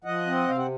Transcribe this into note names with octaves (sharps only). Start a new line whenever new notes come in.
F3 D#5 F#5
C4
C3 F5
F#5